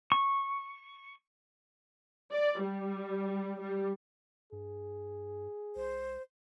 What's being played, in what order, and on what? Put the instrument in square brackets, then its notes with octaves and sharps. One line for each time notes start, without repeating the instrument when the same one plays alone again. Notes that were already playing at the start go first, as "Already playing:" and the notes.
[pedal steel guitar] C#6
[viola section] D5
G3
G3
[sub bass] G2 [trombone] G#4
[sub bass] C2 [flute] C5